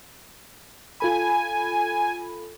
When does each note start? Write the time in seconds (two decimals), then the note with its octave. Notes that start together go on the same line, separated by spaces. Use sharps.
1.00 F4 A4 G#5 B5